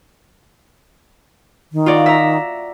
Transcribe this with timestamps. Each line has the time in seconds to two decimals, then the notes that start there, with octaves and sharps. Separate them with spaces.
1.73 D#3
1.86 F4 F#4 D5
2.06 E5 A#5